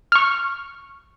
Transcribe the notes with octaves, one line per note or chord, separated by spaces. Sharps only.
C#6 F6